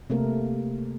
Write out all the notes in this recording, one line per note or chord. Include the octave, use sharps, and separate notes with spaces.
C3 A3 A#3 A#4